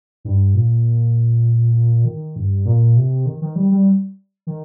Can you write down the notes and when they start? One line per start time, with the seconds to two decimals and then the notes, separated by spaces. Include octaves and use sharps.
0.25 G2
0.54 A#2
2.05 D#3
2.36 G2
2.65 A#2
2.97 C3
3.26 D#3
3.42 D#3
3.56 G3
3.71 G3
4.47 D#3